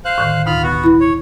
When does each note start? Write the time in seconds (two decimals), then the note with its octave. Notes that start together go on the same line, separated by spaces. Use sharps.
0.05 C5 F5 F#6
0.18 A2 D3 D#3
0.46 D2 B2 D#4 F4 B5 F6
0.63 B3 F#4
0.84 E4 B5 F#6
1.00 C#5